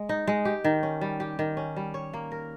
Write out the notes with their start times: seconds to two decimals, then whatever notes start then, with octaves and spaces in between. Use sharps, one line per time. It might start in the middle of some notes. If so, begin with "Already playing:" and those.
Already playing: G#3
0.09 D#4
0.27 G#3
0.45 G4
0.64 D#3
0.83 C#4
1.01 G3
1.20 G4
1.39 D#3
1.57 C#4
1.76 G3
1.94 C#5
2.13 A#3
2.32 A#4